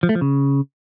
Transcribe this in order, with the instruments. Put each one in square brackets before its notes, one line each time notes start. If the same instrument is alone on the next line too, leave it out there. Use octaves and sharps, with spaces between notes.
[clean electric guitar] F3
A3
F3
C#3